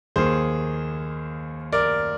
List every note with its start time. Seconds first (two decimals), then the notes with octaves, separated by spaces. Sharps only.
0.16 D#2 D#3 A#3 G#4 C5
1.73 A#4 D5